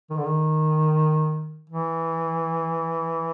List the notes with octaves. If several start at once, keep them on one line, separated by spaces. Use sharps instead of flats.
D#3
D3
D#3
E3